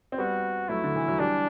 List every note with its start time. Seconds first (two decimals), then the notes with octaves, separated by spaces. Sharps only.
0.12 C4
0.18 G3 B3 F#4
0.68 F#3 A3 E4
0.84 D3
0.96 E3
1.08 F#3
1.19 E3 G3 D4